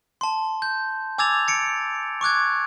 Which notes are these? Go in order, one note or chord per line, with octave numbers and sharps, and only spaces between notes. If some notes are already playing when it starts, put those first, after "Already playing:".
A5 C6
G6
G#5 D6 E6 G#6 A6 F7
A6 C#7 D7
C#6 D6 F#6 G#6